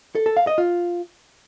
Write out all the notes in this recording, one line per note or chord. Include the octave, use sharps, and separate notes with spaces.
A4
A4
F5
D#5
F4